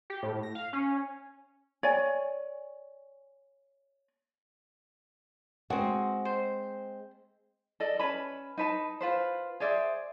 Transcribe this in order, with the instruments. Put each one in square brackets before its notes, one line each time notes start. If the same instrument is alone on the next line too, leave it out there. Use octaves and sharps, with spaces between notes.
[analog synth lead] G4
A2
A#6
F5
C#4
[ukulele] C#5 D5 G#5
[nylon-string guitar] G#3 C4 [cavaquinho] F#4
[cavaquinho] C5
[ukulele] A4 D5 D#5
C#4 B4 A5 B5
D#4 B4 A5
F4 B4 C5
G#4 C5 D5 E5